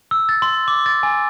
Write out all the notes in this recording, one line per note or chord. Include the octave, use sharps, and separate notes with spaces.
E6
A6
C6
D6
A6
G#5